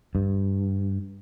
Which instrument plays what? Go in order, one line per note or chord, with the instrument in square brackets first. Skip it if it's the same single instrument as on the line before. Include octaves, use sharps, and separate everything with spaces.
[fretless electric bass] G2